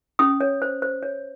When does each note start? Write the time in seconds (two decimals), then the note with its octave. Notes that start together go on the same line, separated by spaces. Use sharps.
0.19 C#4 D#6
0.41 C#5
0.62 C5
0.82 C5
1.03 C#5